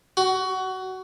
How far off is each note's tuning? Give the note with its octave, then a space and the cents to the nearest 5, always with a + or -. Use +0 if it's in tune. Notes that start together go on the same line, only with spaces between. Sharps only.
F#4 +20